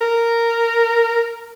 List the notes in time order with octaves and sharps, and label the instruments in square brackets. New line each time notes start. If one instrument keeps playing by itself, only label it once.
[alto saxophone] A#4